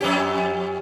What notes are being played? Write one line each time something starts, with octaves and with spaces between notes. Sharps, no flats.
F2 C#4 G4